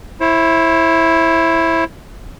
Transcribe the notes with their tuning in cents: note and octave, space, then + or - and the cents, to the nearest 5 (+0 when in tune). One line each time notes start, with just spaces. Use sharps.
E4 +0 C5 +40